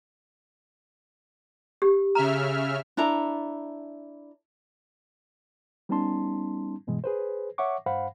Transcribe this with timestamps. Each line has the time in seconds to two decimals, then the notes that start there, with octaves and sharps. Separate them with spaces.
1.82 G4
2.15 C#3 E5 A#5 F6
2.97 D4 E4 A4 A#5
5.89 G3 B3 C#4 D#4 A5 C6
6.87 G2 B2 E3 G#3
7.04 G#4 B4 C5
7.58 C#5 E5 F#5 C#6 D6
7.86 G2 C5 F5 F#5 B5